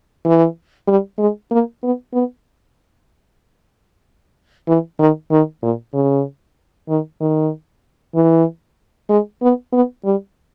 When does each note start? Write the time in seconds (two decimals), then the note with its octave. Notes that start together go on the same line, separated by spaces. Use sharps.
0.25 E3
0.88 G3
1.19 G#3
1.51 A#3
1.83 B3
2.14 B3
4.68 E3
4.99 D#3
5.31 D#3
5.62 A#2
5.94 C#3
6.89 D#3
7.21 D#3
8.15 E3
9.09 G#3
9.42 B3
9.73 B3
10.05 G3